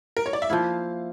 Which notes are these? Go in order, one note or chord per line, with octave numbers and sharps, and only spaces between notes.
A#4
C#5
D5
E5
F3 A#3 E4 F5